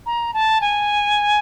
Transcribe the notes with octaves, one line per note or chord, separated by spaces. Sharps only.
A#5
A5
G#5